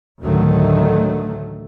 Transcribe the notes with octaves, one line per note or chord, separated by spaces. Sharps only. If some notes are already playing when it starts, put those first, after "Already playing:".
A1 D2 D3 D#3 F#3 A3